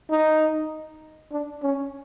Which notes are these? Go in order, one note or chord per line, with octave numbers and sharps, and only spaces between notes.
D#4
D4
C#4